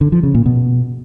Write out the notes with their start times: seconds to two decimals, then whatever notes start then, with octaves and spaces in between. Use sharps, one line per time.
0.01 D3
0.12 F3
0.23 C#3
0.35 A#2
0.46 B2